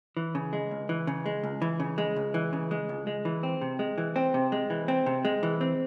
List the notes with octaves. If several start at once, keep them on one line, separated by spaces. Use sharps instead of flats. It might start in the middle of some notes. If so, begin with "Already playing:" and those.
E3
C#3
G#3
C#2
E3
C#3
G#3
C#2
E3
C#3
G#3
C#2
E3
C#3
G#3
C#2
G#3
E3
C4
C3
G#3
E3
C4
C3
G#3
E3
C4
C3
G#3
E3
C4